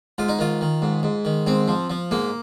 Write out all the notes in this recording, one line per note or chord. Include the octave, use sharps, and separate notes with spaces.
G#2 F4
D#4
D#3 F4
D#3
G#2
G#2
D#3
G#2 C4
F3
F3
G#2 A#3